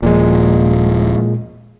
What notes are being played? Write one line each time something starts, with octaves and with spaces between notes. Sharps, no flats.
D#1 A#2 F3 G#3